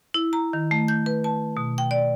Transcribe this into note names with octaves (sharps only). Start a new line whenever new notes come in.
E4
A#5
D#3
A3
G6
B4
A5
B2
G5
D5